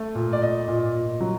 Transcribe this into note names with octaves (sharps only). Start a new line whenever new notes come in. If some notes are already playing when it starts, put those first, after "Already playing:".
Already playing: A3
A#2
D5
A#2 D#5
A#2
A#2
F#3